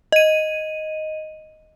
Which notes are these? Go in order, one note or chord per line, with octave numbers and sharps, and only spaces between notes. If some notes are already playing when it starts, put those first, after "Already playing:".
D#5 D#7